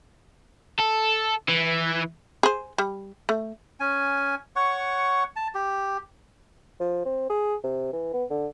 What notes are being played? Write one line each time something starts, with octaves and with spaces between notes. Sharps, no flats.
A4
E3
G#4 C5
G3
A3
C#4 G#5
C#5 F#5 C#6
A5
G4
F3
C4
G#4
C3
E3
B3
D3